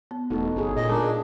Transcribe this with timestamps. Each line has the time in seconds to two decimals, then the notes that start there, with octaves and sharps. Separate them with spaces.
0.11 B3
0.30 E1 A3 B3 D#4 F#4 A4
0.56 G1 C#4 G#4
0.77 A#2 D#5
0.89 G#3 D4 G#4 A#4 A#5